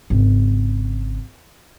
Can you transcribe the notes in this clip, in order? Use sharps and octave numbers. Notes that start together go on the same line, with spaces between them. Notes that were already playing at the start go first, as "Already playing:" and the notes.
G#1 C#3